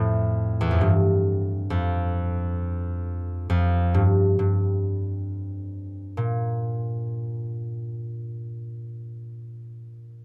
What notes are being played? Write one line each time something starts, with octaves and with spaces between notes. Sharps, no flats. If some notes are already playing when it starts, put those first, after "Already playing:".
Already playing: F2 A2
E2
F2
G2
F2
F2
G2
G2
A#2